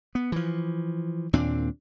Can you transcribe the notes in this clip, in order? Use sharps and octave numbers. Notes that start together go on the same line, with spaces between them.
B3
E3 F3
D#2 A#2 C4 D4